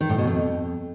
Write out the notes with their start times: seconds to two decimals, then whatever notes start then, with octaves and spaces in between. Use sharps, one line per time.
0.01 D#3
0.09 A2
0.18 B2
0.27 F2